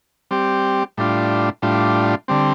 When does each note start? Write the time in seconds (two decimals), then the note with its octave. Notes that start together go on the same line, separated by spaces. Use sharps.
0.31 G3 C4 G4
0.97 A2 G3 D4 F4
1.62 A2 G3 D4 F4
2.28 D3 G3 C4